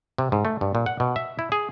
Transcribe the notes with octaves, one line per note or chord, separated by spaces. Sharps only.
C3
G#2
A3
G2
A#2
F#5
B2
E5
E4
G#4